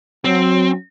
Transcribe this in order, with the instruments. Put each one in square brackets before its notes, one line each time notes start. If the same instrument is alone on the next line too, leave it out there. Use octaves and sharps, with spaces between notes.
[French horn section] F#3 [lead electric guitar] C4